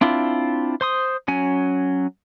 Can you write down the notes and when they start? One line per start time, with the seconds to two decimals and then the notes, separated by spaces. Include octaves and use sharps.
0.01 C4 D4 E4 F4
0.81 C5 C6 D#6
1.28 F#3 C#4 G#5